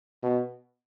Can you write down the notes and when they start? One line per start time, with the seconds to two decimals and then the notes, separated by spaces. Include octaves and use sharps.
0.23 B2